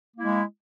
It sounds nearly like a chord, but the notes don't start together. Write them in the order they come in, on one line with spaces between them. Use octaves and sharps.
A#3 E4 G#3